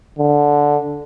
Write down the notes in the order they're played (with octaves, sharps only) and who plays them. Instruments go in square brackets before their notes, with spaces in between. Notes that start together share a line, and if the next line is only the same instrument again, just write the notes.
[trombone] D3